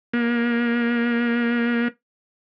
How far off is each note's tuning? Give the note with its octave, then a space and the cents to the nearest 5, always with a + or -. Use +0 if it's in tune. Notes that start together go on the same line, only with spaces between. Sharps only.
A#3 +25